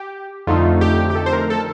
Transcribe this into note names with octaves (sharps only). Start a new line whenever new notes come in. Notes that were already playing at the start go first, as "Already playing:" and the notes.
Already playing: G4
F2 D3 A3 D#4 F4
G4
G4
A4
C5
A#4
A4